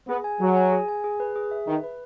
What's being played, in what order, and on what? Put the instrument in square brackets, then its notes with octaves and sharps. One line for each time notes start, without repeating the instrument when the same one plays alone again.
[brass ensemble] B3 [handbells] G#4
[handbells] G#5
[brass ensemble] F#3 [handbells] G#4
[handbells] G#5
G#4
G#5
G#4
B4
G#4
E5
[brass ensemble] D#3 [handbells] B4
[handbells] B4